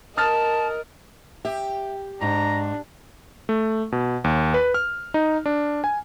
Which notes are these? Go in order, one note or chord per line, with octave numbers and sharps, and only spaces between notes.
A#4 D#5 A5 D#6 F6 A6
G4 E5
G#2 D4 A#5
A3
B2
D#2
B4
F6
D#4
D4
G#5